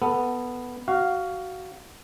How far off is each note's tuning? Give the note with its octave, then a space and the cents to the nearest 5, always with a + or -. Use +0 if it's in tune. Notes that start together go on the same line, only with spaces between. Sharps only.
B3 +0 A4 +25
F#4 +15 F5 +0